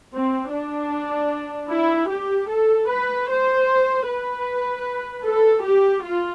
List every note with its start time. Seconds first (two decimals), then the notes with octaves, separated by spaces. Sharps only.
0.13 C4
0.53 D4
1.70 E4
2.10 G4
2.50 A4
2.90 B4
3.29 C5
4.08 B4
5.25 A4
5.65 G4
6.05 F4